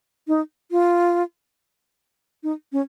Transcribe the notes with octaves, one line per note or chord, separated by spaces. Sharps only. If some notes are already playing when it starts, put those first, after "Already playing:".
D#4
F4
D#4
C#4